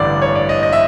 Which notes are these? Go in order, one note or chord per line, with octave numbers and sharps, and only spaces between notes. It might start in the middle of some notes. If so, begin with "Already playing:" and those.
Already playing: A1 G2 D3 D5
C#5
D5
D#5
D#5
E5